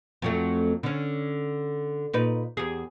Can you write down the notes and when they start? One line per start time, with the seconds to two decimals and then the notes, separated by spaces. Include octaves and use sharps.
0.22 F2 F#3 A3
0.83 D3 C#4
2.13 A#2 D#4 B4
2.57 E2 G4 G#4